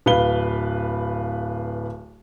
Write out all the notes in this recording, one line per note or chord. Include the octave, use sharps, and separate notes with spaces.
D1 B4 F5 G7